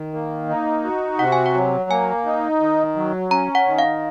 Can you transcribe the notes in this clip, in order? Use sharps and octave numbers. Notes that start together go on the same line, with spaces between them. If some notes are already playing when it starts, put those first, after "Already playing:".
Already playing: D#3
A#3
D#4
F#4
C3 F#5
G#5
F#5
F#3
A#3 G#5
D#4
D#3
F#3
C#4 A#5
F#5
D#3
F5